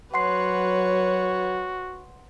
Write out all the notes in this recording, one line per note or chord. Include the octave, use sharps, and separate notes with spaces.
F#3 F#4 B4 C#5 F#5 C6 C7